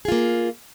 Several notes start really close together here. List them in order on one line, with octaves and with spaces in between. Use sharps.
G#4 F4 A#3